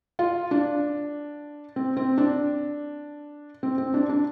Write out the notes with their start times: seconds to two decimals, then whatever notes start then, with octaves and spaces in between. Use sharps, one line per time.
0.19 F4
0.51 D4
1.76 C4
1.97 C4
2.18 D4
3.63 C4
3.78 C4
3.94 D4
4.10 D4